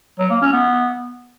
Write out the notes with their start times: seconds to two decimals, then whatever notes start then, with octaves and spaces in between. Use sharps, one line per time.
0.19 F#3
0.30 A#3
0.41 C#4
0.53 B3